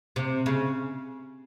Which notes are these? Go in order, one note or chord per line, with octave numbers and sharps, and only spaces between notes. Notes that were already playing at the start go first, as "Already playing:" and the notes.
C3
C#3